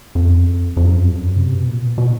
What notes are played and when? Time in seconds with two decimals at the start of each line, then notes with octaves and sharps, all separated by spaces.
0.15 F2
0.77 F2
0.85 F#2
0.93 F2
1.07 F#2
1.36 C3
1.52 B2
1.66 A#2
1.82 B2
1.98 B2